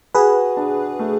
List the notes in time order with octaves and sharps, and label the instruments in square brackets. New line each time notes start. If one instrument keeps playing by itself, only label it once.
[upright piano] F#4 [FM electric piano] G#4 B4
[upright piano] D4
A3